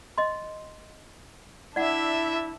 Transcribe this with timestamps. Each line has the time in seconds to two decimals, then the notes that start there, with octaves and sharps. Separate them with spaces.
0.18 D#5 C6
1.76 D4 E4 D5 E5 F#5